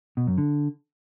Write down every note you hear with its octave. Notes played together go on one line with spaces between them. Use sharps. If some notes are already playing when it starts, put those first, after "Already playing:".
B2
F#2
D3